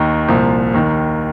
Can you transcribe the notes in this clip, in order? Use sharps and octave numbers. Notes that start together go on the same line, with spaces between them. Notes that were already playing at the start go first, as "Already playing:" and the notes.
Already playing: D#2 D#3
C2 A#2 F3
D#2 D#3